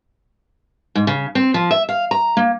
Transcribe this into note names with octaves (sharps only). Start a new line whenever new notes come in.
G#2
C#3
C4
F3
E5
F5
A#5
A#3